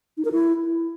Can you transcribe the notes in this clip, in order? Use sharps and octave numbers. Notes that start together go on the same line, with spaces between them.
D#4
A#4
E4